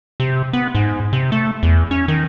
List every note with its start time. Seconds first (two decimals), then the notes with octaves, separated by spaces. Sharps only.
0.20 C3
0.53 B3
0.75 G#2
1.13 C3
1.32 A3
1.63 E2
1.91 C#4
2.08 D#3